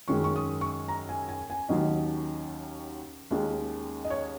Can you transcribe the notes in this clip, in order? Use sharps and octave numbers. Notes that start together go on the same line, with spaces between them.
F#2 D#3 G#3 C#4 C#6
C#6
D#6
C#6
A#5
G#5
G#5
G#5
D#2 D#3 F#3 C#4 D#5
D#2 D#3 G#3 C#4
D#5
C#5